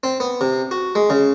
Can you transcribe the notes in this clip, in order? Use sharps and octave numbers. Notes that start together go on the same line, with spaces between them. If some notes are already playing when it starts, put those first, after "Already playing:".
C4
B3
C3
F#4
G#3
C#3